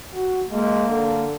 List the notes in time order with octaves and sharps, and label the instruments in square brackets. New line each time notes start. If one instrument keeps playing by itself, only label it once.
[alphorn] F#4
[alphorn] G#3 [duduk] A#3
[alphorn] D3